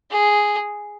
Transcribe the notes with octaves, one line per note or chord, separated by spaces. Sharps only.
G#4